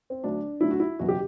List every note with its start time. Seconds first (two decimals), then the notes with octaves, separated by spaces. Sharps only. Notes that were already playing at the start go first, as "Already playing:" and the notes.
0.10 C4
0.23 D2 D3 F#3 D4
0.61 D2 D3 F#3 E4
0.71 F#4
0.80 E4
0.99 F#1 E2 B2 F#3 F#4
1.09 G4